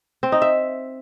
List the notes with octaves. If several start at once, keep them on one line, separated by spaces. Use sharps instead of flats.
C4
D#4
E5